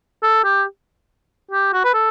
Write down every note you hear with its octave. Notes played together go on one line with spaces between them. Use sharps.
A4
G4
G4
F#4
B4
A4